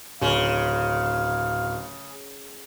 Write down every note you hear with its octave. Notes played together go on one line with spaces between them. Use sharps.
D1 C#3 F5